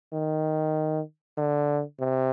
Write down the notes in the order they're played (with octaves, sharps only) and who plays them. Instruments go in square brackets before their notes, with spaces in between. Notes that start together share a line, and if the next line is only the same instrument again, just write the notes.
[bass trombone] D#3
D3
C3